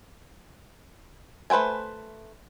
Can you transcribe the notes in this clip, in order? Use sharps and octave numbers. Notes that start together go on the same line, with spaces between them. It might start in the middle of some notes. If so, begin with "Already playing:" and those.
A3 B4 C5 G5 G#5